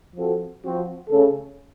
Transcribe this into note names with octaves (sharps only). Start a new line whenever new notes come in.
F3 C4 F#4 A4
F3 C4 F#4
C#3 A3 C#4 A4